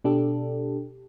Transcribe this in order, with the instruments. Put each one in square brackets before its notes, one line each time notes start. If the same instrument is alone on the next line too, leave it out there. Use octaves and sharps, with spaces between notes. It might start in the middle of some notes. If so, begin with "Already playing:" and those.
[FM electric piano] B2 D4 G4 A4